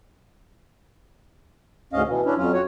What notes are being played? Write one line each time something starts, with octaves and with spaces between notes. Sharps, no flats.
D2 G#2 C#4 D#5 F5
B2 E3
C#4 D4 E4
F2 F#3 C#4 F4
F#4 C#5